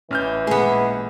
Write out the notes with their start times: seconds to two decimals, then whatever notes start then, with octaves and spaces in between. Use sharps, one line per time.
0.11 A1 E3 C#4 F6 G6
0.47 A#2 G#3 A3 B3 G#4